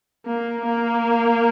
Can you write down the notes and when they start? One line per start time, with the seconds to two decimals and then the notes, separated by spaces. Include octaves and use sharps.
0.26 A#3
0.65 A#3